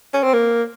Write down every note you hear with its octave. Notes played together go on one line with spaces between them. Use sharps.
C#4
C4
A#3